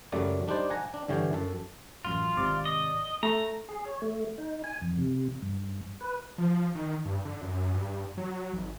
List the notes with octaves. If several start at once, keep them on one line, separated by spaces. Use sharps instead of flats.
C#2 F#2 F#3 G3 A3 D5
G3 D4 D#4 C5 D5
F#5 G#5 A#5
D4
G2 D3 E3 C#5 G5
F#2 A4
A1 F#2 F4
G#1 C3 D5
D#5
A3 A#5
G#4
C#5
A3
D#4
G#5
F2
C3
G2
B4
F3
D#3
G2
D3
F#2
G2
F#3
G#1